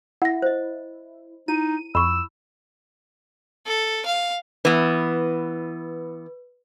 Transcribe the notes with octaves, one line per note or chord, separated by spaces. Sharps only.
E4 F#5 A#6
C5 D#5
D#4 E4 D#7
F2 B5 C#6 E6
A4
F5
E3 B3 B4